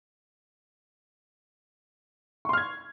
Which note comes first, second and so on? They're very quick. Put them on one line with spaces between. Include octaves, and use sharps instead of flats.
C#6 C6 F6 G#6